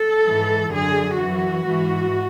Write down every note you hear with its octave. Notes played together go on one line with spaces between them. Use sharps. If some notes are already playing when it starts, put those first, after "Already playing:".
Already playing: A4
G#2 E3
F#2 D3 G#4
F#2 E3 F#4
G#2 E3